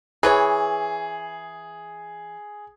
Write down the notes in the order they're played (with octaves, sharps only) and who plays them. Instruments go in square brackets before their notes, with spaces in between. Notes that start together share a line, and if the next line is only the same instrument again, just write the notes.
[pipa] E3 B4 C#5 [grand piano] G#4